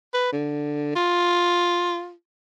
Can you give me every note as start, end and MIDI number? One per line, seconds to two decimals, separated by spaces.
0.14 0.31 71
0.33 0.92 50
0.96 2.12 65